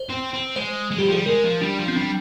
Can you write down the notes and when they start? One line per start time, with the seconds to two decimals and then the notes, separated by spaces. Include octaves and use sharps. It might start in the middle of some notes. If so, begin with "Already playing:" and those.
Already playing: C5
0.09 C4
0.33 C4
0.56 G#3 C5
0.91 G#3
0.98 G3 G4
1.07 F3
1.12 G3 G#4
1.26 G#3 A#4
1.44 F3
1.61 G3 D4
1.79 F3
1.88 C4
1.96 G3 D4